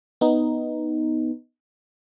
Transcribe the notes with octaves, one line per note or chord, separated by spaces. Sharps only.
B3 D#4